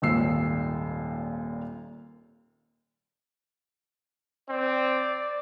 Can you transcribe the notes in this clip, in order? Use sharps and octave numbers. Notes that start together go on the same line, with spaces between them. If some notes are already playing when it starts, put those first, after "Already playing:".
D#1 G#1 D#2 A#2 E6 C7
C4 D5